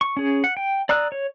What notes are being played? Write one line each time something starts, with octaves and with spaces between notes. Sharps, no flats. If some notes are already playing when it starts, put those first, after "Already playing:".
C#6
C#4 G#4
F#5
G5
D5 A#5 D#6 E6 F#6
C#5